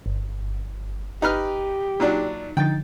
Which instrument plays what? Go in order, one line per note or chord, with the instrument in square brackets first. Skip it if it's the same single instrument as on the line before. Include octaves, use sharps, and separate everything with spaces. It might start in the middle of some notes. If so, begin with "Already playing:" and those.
[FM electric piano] G1
[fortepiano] D#4 B4 F6 [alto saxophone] G4
[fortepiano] A#2 F#3 D4 [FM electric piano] D#4
[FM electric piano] D3 F3 A6 [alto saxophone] D#4 [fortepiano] G5